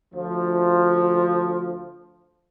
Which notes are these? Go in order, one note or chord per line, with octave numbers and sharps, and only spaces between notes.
D2 F3